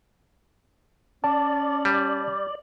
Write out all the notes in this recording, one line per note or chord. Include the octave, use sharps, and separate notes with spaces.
C#4 D5 A5
G3